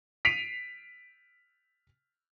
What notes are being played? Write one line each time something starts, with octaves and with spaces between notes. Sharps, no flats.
B6 C7 D7 D#7 F7